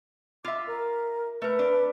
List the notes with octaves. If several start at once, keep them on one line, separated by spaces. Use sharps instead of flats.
F4 E5 D6
A#4
A3 A#4 B4
D4